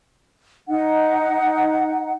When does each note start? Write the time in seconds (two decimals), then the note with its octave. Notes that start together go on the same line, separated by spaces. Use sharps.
0.68 D#4 F#5